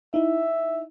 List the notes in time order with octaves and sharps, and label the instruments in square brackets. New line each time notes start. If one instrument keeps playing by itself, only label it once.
[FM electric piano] D#4 E4 [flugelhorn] E5